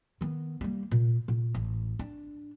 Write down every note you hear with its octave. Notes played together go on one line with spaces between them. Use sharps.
D#3 B3
G3 A#3
A#2
A#2
A1
D4